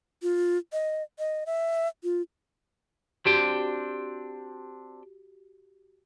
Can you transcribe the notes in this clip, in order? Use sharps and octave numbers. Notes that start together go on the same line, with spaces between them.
F4
D#5
D#5
E5
F4
C4 D4 F#4 G4 G5